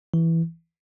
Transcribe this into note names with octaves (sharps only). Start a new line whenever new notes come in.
E3